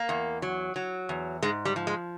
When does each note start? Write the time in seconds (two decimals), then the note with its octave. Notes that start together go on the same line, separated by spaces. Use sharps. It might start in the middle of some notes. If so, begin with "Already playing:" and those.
Already playing: A#3
0.09 E2
0.42 F#3
0.76 F#3
1.09 E2
1.42 G#2 G#3
1.65 G3
1.76 F3
1.87 G#3